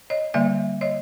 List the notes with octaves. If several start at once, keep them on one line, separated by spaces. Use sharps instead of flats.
C#5 D#5
D3 G3 A#3 D5 E5
C#5 D#5